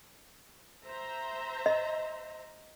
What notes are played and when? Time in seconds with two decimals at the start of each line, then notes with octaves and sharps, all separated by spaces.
0.85 C5 E5 A#5
1.66 D#5